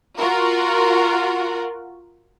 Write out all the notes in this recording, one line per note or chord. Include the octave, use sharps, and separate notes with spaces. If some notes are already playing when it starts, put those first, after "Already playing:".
F4 F#4 A#4